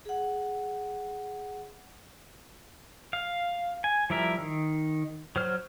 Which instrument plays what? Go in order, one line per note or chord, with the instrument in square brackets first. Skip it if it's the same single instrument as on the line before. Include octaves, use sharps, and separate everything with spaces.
[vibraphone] G#4 F#5
[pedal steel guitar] F5
G#5
F3 G3 E4 A#4 E5
D#3
F#3 C5 F6